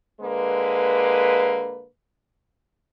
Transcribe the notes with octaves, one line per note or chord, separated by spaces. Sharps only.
D3 G#3 A#3 B4